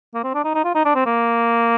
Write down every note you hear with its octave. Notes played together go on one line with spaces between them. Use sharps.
A#3
C4
D4
D#4
D#4
F4
D#4
D4
C4
A#3